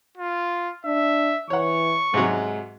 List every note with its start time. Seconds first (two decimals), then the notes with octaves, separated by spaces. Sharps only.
0.18 F4
0.85 D4 E5
1.50 E3 C#5 F#5 C#6
2.14 G#2 C3 F#3 G#3